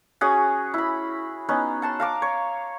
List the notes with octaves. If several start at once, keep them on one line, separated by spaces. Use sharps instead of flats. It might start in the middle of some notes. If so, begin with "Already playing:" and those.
C#4 F#4 G#4 D#6
E4 B5
B3 C#4 D#4
F#5 A5 C6
F5 A#5 D6
C#5